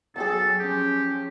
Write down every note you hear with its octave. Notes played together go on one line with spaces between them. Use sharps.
F#3 B3 F#4 G#4 A4 G5 A5
F3 C#4 G4